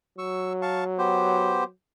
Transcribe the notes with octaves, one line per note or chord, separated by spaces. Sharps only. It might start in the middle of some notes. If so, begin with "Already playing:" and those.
F#3 C#6 E6
F5 A5 C#6
B3 G4 C5